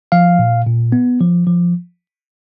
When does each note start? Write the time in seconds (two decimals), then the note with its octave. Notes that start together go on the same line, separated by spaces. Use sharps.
0.12 F3 F5
0.39 A#2
0.66 A#2
0.92 B3
1.20 F3
1.47 F3